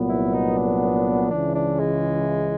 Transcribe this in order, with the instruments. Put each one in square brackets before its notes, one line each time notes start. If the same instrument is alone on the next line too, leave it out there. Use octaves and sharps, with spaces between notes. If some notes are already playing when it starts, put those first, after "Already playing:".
Already playing: [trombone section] C2 A#2 F#3 B3
[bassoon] E4
D#4
D4
[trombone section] C#2 C#3 E3 [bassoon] D4
[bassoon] D4
G#3